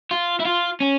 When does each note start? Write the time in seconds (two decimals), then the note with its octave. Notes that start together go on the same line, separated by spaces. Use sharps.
0.11 F4
0.40 E4
0.45 F4
0.80 C#4